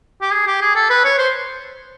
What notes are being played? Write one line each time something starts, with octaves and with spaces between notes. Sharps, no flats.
G4
G#4
G4
G#4
A4
B4
C#5
C5